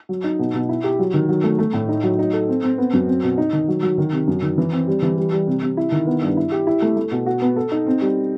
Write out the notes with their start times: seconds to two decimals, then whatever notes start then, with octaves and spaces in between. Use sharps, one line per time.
0.09 F#3
0.24 D#4
0.39 B2
0.54 B2
0.69 E4
0.84 G4
0.99 F#3
1.14 D#3
1.29 F#3
1.44 A3
1.59 A3
1.73 A2
1.88 D#4
2.04 F#3
2.19 D#4
2.33 A4
2.48 C4
2.63 C4
2.78 B3
2.93 F#2
3.08 C4
3.23 B2
3.38 D#4
3.53 D#3
3.68 F#3
3.83 F#3
3.98 D#3
4.13 C3
4.28 F#2
4.43 D#3
4.58 E3
4.72 C4
4.87 G3
5.02 E3
5.17 G3
5.32 G3
5.47 C3
5.62 C3
5.77 E4
5.92 D#3
6.07 B3
6.22 G2
6.37 E4
6.52 G4
6.67 E4
6.82 A3
6.97 A3
7.11 B2
7.26 F#4
7.42 B3
7.56 A4
7.72 D#4
7.86 C4
8.01 G3